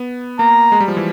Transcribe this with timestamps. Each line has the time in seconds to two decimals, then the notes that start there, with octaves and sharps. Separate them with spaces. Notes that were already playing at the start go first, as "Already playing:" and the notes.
Already playing: B3
0.39 A#3 A#5
0.72 G#3
0.80 G3
0.88 F3
0.97 E3